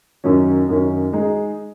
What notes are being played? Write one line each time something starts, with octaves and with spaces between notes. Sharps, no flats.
F#2 D#3 F#3 C#4
F#2 D#3 F#3 C#4
G#3 D#4 G#4